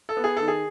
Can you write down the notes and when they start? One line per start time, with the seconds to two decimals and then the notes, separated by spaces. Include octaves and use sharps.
0.09 A4
0.17 B3
0.24 G#4
0.37 D#3 A4
0.48 G#4